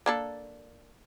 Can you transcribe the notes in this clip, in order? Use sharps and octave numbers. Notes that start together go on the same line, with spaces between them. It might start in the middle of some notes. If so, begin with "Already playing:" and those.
A#3 D4 A4